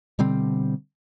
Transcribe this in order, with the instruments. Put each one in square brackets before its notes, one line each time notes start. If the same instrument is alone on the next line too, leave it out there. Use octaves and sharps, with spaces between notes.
[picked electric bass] B2 D3 G3 C4